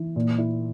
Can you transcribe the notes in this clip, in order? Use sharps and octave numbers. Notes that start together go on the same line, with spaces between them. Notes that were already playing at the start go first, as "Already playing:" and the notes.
Already playing: E3
A#2
E4